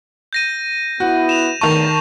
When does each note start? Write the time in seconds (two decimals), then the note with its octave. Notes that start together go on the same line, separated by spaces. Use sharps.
0.33 G6 A#6 D#7
1.00 B3 E4 F#4
1.29 E7 F7
1.61 E2 A2 D#3 A5 C#6 F7